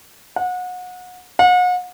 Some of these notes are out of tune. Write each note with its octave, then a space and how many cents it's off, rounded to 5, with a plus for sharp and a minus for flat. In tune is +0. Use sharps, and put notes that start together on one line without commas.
F#5 -30
F#5 -40